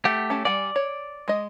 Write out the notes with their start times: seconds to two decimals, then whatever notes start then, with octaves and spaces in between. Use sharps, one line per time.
0.05 A3 G4 F#5
0.30 C#4 A5
0.45 G3 D5 F#5 G#5
0.76 C#5
1.28 G#3 D#5